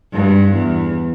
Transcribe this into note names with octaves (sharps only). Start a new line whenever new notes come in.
G2
E2